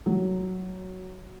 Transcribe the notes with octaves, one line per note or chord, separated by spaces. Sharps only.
F#3